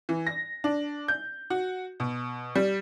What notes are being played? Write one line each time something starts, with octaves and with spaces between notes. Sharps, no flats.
E3
A#6
D4
G6
F#4
B2
G3